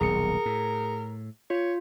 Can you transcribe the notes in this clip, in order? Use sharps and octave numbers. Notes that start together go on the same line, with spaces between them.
D#1 B1 G#4 A#4 C#7
A2
F4 C#5